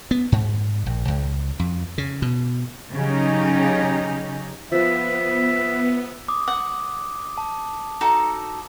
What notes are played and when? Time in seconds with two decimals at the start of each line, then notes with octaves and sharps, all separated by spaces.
0.11 B3
0.32 G#2
0.86 A#1
1.08 C#2
1.59 F2
1.98 C#3
2.22 B2
2.93 C#3 F#3 C#4 D#4 G4
4.72 F3 B3 B4 E5
6.28 D6 D#6
6.48 F#5 D6
7.38 A5
8.01 D#4 F#4 A4